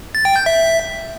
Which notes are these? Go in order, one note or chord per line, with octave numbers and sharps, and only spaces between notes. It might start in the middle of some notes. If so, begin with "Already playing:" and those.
A6
G5
G6
E5